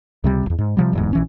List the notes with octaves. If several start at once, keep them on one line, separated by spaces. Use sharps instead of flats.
C#2 C3 G3
A#1 E2
G#2
C3 F3 G3
D1 E2 G#2
A#1 E3 C#4